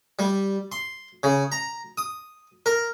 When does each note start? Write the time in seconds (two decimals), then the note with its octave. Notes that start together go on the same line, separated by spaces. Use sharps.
0.19 G3
0.72 C6
1.23 C#3
1.52 A#5
1.98 D#6
2.66 A#4